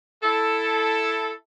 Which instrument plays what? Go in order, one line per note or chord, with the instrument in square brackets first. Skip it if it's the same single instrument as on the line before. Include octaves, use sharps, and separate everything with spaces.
[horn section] E4 A4